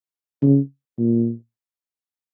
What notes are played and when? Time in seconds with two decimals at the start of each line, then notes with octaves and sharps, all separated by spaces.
0.42 C#3
0.98 A#2